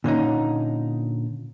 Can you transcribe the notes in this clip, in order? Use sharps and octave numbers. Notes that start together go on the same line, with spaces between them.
A#2 D3 C#4 D#4